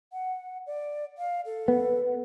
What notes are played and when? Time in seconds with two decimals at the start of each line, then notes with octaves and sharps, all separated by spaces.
0.13 F#5
0.67 D5
1.18 F5
1.46 A4
1.68 B3